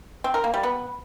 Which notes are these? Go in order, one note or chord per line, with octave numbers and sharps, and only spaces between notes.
C4
A#4
A#3
G3
B3